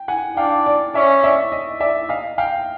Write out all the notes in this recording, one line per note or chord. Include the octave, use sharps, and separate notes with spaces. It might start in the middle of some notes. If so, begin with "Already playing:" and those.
Already playing: G5
F#5 G#5
D4 F5 G5
D5
C#4 D5 E5
D5 E5
D#5
D5 E5
D#5 F5
F5 G5